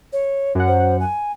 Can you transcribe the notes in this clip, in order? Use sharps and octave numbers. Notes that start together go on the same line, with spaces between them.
C#5
F#2 F#5
C5
G#5